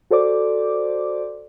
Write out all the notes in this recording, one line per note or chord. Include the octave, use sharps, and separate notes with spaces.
F#4 A4 C5 D5 D6